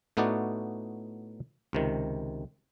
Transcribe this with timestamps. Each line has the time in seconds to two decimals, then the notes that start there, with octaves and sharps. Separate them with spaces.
0.17 A2 A3 B3 D#4 F#4 D5
1.73 C#2 C3 D#3